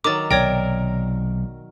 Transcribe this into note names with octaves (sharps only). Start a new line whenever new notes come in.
D#3 F#3 D6 A6
B1 C3 A#4 C#5 D5 G5